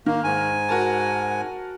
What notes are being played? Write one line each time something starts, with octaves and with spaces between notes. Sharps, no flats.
D#3 A#3
G#2 G#5
F#4 A#4 A5